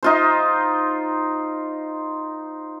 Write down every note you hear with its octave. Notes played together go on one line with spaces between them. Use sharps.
D#4 F4 C5